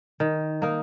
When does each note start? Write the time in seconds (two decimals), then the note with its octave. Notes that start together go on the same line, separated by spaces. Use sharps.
0.20 D#3
0.62 A#3 D#4 A#4